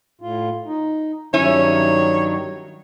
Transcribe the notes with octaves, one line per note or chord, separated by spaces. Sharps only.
A2 F4
D#4
G2 D#3 F#3 C#4 E4 C#5